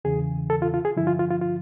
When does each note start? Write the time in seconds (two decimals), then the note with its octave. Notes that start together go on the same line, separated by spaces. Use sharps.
0.05 E2 C#3 E3 G#4
0.50 A4
0.62 F4
0.74 F4
0.85 G#4
0.97 G2 D3 F3 E4
1.07 F4
1.19 F4
1.30 F4
1.41 F4